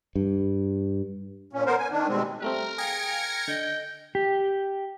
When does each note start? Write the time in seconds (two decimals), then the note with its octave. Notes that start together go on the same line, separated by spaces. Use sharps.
0.16 G2
1.53 A#2 C#4
1.66 B3 A#4 C5
1.78 G#5
1.91 D#3 D4
2.08 B2 G3 G#3 C4
2.42 G3 A3 C4 A#4 A#5
2.78 G#4 F5 G5 G#6 A#6 C#7
3.48 D3 D#5 G5
4.15 G4